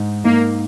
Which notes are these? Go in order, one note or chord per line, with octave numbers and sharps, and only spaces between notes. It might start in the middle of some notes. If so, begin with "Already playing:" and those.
Already playing: G#2 D#4
A#3 D#4